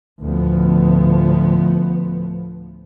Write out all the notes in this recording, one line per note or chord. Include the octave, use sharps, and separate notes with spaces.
D2 A2 F3 B3